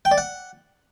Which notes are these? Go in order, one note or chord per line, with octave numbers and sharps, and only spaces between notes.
G5
D5
F#5